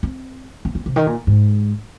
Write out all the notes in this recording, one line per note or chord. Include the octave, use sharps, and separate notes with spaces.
C4
C4
C4
C3
D#3
A#2
G#2